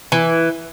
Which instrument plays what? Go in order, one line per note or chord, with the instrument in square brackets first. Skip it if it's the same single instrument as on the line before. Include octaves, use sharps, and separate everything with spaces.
[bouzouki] E3